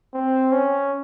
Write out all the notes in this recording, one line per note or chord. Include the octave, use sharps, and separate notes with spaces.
C4
C#4